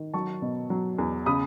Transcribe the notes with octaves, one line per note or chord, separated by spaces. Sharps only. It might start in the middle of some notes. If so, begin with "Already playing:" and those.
Already playing: D#3
F#3 A5 C#6
B2
F#3
E2
C#3 B5 D#6